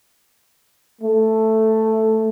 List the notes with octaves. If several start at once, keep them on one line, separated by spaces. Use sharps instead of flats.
A3